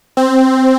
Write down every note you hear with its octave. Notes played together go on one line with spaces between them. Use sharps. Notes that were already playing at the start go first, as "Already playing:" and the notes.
C4